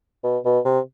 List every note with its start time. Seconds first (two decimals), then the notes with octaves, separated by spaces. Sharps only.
0.24 B2
0.45 B2
0.65 C3